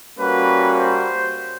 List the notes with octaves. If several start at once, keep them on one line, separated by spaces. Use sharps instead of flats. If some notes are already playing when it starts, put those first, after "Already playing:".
G3 A#3 C#4 F#4 B4
C5